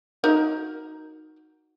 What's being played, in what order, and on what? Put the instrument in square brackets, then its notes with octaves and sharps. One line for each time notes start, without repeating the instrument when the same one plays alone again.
[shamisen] D#4 F#4 A#4